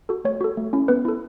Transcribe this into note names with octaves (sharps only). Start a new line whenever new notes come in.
F#4 A4
A3 C#5
F#4 A4
A3
C#4 E4
B3 B4
E4 A4